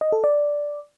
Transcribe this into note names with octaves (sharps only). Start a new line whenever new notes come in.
D#5
A4
D5